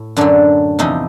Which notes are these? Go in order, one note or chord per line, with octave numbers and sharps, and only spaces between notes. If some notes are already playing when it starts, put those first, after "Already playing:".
Already playing: A2
F#2 D3 F#3 D4
E2 C3 F3 D#4